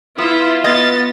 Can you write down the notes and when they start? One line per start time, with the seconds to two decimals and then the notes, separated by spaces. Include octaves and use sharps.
0.18 B3 E4 F4 E5
0.64 B3 D#5 A6